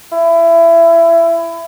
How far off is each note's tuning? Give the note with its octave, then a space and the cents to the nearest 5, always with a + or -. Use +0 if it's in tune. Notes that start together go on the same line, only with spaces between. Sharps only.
E4 +25